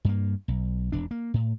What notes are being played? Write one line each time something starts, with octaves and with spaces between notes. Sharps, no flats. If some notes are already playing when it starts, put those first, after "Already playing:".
G2 A#3
B1
E1 D4
A#3
A2